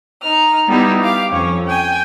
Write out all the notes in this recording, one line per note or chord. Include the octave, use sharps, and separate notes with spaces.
D#4 F6
G3 B3 D#4 E4 G4
G4 F5 D6
F2 C#4 C#5
G5 G#5